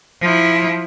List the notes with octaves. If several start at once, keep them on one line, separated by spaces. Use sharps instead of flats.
F3 E4